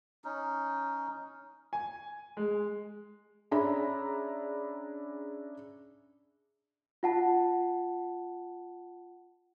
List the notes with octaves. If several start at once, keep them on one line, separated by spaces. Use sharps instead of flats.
C#4 D#4
G#5
G#3
C#4 D4 G#4 E5 A#5 B5
F4 F#5 A5